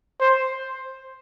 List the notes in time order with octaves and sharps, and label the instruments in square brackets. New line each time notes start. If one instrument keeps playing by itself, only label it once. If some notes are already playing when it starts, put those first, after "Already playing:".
[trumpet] C5